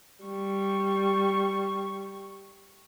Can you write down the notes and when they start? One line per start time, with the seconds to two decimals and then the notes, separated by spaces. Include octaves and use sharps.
0.24 G3 C#6